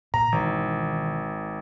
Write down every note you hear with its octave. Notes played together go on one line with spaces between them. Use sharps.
A#2 A#5
G#1 B2 D#3 E3